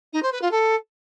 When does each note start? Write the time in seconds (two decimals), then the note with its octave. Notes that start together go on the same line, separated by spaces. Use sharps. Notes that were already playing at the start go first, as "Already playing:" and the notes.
0.13 D#4
0.22 C5
0.32 B4
0.41 F4
0.51 A4